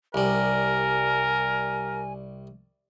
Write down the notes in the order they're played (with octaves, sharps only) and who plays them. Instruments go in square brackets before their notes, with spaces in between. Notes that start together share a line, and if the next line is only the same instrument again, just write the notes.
[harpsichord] C2 G3 [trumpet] A#4 [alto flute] G#5